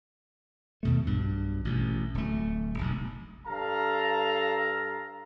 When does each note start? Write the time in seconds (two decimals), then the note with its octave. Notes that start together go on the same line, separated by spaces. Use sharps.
0.83 D#2 B2 A3
1.06 B1 G2 B2
1.65 A1 B2
2.14 D1 A3
2.78 E1 B1
3.47 G2 A4 F5 A#5